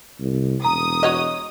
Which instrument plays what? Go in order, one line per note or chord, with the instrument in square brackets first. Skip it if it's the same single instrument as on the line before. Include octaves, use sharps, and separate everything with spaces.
[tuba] C2
[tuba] E1 [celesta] A#5 [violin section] D#6
[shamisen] F#4 C#5 D#5